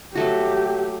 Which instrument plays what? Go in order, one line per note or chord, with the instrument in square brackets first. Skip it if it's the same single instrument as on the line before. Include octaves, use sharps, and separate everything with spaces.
[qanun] F#3 A3 F#4 [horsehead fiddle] G4